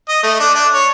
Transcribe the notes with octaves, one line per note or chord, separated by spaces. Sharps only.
D#5
A3
D4
D4
C#5